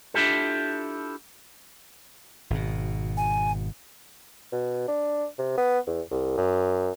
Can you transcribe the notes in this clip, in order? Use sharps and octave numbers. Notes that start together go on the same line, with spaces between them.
D4 E4 F4 G4 A4
G#1 B2
G#5
B2
D4
C3
B3
E2
C2
F#2